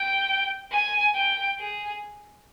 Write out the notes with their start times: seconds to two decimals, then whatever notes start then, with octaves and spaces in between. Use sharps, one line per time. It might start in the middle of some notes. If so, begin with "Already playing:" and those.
Already playing: G5
0.71 G#5
1.15 G5
1.59 G#4